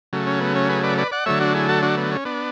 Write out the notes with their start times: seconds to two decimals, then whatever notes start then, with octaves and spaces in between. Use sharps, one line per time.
0.13 C#3 F#3 A3
0.27 C#4
0.41 B3
0.56 C#4
0.69 G#4 B4
0.83 B4 D5
0.98 B4 D5
1.11 D5 F#5
1.26 D3 F#3 A3 C#5 E5
1.40 D4 F#4
1.54 E4 G#4
1.68 F#4 A4
1.83 D4 F#4
1.97 B3
2.11 C#4
2.25 B3 D4